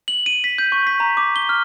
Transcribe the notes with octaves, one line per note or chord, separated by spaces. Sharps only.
F#7
D#7
B6
G6
C#6
B6
A#5
D6
G7
F6